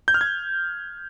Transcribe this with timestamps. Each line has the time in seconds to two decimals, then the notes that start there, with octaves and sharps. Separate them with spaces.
0.08 G6
0.14 F6
0.21 G#6